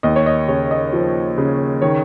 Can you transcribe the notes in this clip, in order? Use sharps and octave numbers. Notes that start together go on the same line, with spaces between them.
D#2 D#5
C#5
D#5
C#3 C#5
D#5
F3
C#3
D#3 C#5